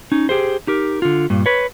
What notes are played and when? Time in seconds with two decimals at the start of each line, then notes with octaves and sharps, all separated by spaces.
0.12 C#4 D#4
0.29 G4 G#4 C5
0.67 D#4 G4 A#4
1.02 D3 F4
1.30 G2 A#2
1.46 B4 C#5